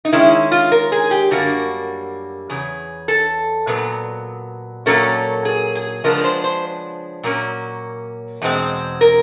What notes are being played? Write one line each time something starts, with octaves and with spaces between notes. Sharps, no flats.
D#4
D#3 G#3 C#4 E4
F4
A#4
G#4
G4
F#2 D3 G3 A#3 F#4
E2 C#3 G#4
A4
A#2 F#3 B3
A#2 F#3 A#3 C#4 A4
G#4
G#4
C#3 F3 G#3 B3 D4 A#4
C5
C5
A#2 F#3 A#3 C#4
E2 B2 G#3 C4
A#4